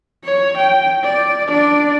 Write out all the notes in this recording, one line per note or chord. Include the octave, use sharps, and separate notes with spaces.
C#5
G5
D5
D4 D5